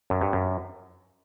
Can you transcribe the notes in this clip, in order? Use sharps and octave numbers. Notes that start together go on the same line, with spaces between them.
F#2
G2
F#2